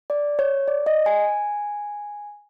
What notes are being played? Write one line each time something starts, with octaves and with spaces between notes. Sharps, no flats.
D5
C#5
D5
D#5
G#5